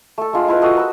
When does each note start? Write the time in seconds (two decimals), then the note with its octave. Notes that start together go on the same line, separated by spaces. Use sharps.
0.18 A3 A4
0.33 G#3 D4 F4
0.48 E4 F4 B4
0.62 F#4 A4 D#5
0.77 A#4 B4 E6